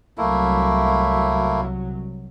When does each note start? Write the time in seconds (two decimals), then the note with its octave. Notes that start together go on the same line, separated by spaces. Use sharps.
0.18 C2 F#3 A3 A#3 E4